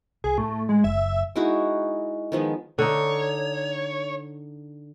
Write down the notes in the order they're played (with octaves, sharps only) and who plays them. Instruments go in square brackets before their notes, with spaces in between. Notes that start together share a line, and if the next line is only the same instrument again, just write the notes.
[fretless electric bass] C2 [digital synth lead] G#4
[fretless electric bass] A2 [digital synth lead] A3
[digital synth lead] G#3
[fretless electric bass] F#1 [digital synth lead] E5
[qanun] G#3 D#4 E4 F#4
D#3 F3 G#3 B3
[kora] D3 D#4 [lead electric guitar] C#5